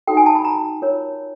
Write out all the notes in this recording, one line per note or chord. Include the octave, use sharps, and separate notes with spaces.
D#4 F#4 A4 G5
G#5
A5
B5
A#5
F4 A#4 C#5